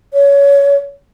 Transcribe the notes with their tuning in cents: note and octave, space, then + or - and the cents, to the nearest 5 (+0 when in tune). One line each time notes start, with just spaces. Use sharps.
C#5 +20